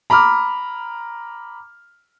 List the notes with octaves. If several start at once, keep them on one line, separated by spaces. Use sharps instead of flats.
A#5 B5 D6 F6